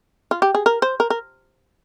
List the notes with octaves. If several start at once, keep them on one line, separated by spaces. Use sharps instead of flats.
F4
G4
G#4
A#4
C5
A#4
A#4